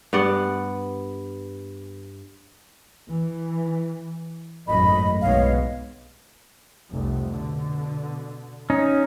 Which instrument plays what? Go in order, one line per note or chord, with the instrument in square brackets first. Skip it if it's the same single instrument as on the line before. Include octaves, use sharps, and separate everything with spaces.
[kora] G2 B3 D5 F#5
[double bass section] E3
[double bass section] G#1 F#2 A2 [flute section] D#5 B5
[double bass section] B1 G#3 B3 [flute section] C#5 D#5 F5
[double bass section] F1 C2
B2 D3
[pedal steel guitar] C#4 D#4